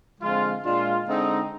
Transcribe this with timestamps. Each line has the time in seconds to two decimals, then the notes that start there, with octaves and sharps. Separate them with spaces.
0.20 D3 F3 G#3 C4 F4
0.63 A#2 G#3 D4 F4
1.06 D3 G#3 C4 D#4